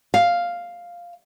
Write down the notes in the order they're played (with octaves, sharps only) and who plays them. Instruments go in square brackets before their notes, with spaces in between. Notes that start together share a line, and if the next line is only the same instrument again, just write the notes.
[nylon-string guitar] F5